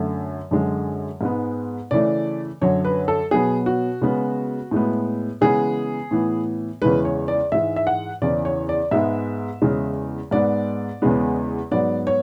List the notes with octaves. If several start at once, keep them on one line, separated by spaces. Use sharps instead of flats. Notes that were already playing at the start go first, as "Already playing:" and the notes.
Already playing: F#2 D3 A3
F#2 D3 G#3
G#2 G#3 B3
C#3 E3 A3 D5
F#2 D3 F#3 C#5
B4
A4
B2 F#3 B3 G#4
F#4
C#3 G#3 B3
A2 G#3 B3
C#3 E3 G#3 B3 G#4
A2 E3 B3
E2 C#3 E3 G#3 B4
C#5
D5
G#2 E3 G#3 E5
E5
F#5
E2 C#3 E3 D5
C#5
D5
G#2 G#3 B3 E5
E2 C#3 G#3
G#2 G#3 B3 D5
E2 C#3 G#3 B3
G#2 F#3 B3 D5
C#5